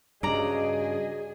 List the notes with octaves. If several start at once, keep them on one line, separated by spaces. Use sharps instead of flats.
G2 C#3 D4 F#4 G#4 D5 D#5 A#5